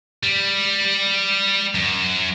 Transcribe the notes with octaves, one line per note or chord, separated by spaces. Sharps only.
G3
F#2